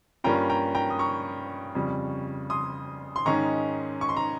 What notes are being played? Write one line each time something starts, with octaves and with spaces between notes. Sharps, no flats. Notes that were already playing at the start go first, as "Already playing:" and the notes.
G2 G3 A#3 C#4 F4 G5 A#5
G5 A#5
G5 A#5
D#6
A#5 C#6
F2 C#3 G3
C6 D#6
C6
G#2 D#3 G#3 C#4 A#5 C#6
C#6
C6
A#5